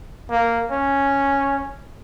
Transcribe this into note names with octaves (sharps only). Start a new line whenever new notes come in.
A#3
C#4